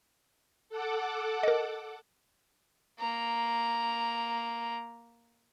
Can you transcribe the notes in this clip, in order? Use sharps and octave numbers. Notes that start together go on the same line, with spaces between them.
A4 F#5 D6
A#4 D#5
A#3 A#5